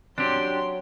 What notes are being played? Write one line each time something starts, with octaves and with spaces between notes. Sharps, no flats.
F#3 C4 D4 G4 C6